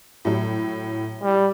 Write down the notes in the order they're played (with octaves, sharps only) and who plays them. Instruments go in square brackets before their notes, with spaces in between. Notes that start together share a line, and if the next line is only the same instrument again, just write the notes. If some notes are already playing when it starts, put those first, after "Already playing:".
[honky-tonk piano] A2 F#3
[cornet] G3